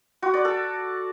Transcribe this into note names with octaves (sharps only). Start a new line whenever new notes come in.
F#4
D5
A4